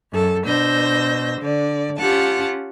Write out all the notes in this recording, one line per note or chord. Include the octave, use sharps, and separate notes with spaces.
F#2 A4
B2 D4 C5 E6 G6 A#6
D3 D5
C#4 F4 G4 F#5 A5